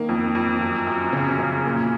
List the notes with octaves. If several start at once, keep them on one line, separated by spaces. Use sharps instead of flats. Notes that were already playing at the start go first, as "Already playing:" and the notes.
Already playing: D#3 A#3
F2
F2
F#2
F#2
C#3
C#3
A#2